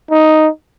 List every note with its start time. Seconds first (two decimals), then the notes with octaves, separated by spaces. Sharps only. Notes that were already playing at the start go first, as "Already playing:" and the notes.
0.11 D#4